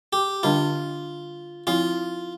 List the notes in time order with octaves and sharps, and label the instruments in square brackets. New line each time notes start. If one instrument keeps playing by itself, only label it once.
[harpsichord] G4
[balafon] D3 G3 D4 [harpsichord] F4
[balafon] F3 C4 E4 [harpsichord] F4